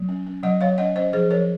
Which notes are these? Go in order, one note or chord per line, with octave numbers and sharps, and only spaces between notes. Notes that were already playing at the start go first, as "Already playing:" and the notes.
Already playing: F#3
C#4
C#4
F#3 D#5 F#5
F#3 C#5 F5
C#4 D#5 F#5
C#4 C5 D#5
F3 G#4 C5
F3 A#4 C#5